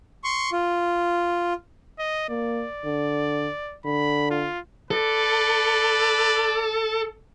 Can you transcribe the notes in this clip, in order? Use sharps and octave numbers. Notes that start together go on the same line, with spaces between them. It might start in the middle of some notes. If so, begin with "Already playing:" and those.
C6 C#6
F4
D#5
A#3 D5
D3
D3 B5
F4
A4 B4 D5